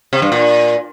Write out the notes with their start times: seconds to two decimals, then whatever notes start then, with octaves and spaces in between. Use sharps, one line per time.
0.13 C3
0.22 G2
0.32 A#2